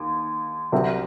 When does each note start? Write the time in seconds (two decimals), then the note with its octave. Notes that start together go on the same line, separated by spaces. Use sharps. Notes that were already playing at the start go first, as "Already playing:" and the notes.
Already playing: D#2
0.72 C2 C3 F#3 C4